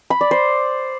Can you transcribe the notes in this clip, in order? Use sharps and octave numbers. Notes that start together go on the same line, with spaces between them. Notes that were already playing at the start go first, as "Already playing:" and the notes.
B5
D5
C5